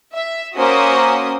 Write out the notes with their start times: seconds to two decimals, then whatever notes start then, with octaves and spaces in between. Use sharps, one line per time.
0.13 E5
0.56 A#3 C#4 F#4 C5 D#6